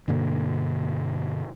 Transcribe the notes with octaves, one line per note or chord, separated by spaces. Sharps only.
G2 B2 D3 A#3